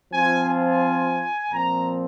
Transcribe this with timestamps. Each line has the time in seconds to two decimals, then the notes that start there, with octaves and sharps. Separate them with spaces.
0.12 F3 C4 F4 G#5
0.47 G#5
1.50 A#2 F3 C4 A#5